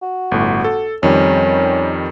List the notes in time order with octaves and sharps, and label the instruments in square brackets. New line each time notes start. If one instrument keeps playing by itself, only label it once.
[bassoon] F#4
[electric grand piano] G1 A2
A4
[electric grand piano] F2 D#3 G3 [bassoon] C#4